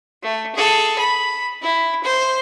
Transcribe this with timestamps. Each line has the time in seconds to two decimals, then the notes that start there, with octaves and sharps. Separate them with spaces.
0.23 A3
0.55 G#4 A4
0.98 B5
1.62 E4
2.03 C5